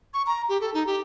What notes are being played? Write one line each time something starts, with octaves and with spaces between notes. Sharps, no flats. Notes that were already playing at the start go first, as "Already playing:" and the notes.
C#6
A#5
G4
A4
D#4
G4